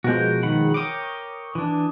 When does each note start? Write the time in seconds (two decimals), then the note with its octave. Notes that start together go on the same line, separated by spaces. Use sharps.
0.04 B2 F3 G#3 F#4 A#4 G6
0.43 D#3 F#5 B5
0.74 A#4 C#5 G5 D6 D#6
1.55 E3 D4